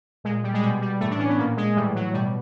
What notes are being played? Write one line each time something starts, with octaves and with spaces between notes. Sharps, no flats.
A#2 G#3
G3
G#3
B2 G3
G3
A2 E3 A3
D4
C#4
B3
A#2 A#3
G#3
A2 E3 G3
F#3
B2 G3